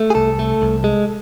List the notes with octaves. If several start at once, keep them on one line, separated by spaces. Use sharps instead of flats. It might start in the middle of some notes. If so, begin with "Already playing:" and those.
Already playing: A3
G#4
C2 A4
A3
C2
G#3